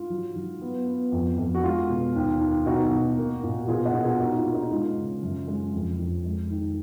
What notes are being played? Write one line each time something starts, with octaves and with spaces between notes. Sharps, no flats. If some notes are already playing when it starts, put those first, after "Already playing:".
Already playing: G#2 F4
F#3
F#3
B3
B3
F2
F2
F#4
G#3 F4
B2
D#2
D#3
B2 D#4 F#4
B2
A#3
A#2
F#4
B2 F4 G#4
D#5 F#5
B2
F4 G#4
A#3 D#4 F#4
F4
A#3
D#4
G#3 F4
C#3
F#2
G#3
F2
F2
G#3
D#3